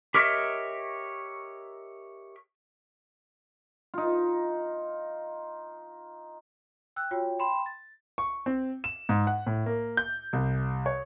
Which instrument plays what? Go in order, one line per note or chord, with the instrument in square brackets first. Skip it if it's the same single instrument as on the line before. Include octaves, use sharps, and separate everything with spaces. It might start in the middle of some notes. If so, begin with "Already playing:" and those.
[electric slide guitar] G4 A#4 C#5 D#5 E5
[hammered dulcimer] D#4 F4
[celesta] G5 E6 F#6
F4 F#4 C#5 G5
G5 B5 C6 E7
A6
[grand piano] C#6
C4
E7
G#2
F#5
A2
A#3
G6
C2
C#5